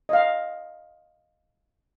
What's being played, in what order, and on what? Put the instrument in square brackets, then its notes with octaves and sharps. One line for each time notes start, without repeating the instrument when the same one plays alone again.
[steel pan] D#5 F5